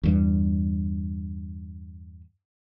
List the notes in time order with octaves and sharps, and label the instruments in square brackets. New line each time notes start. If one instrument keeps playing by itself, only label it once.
[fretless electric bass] E2 G2